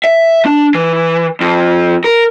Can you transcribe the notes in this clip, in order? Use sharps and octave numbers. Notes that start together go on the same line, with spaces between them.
E5
D4
E3
F2
A#4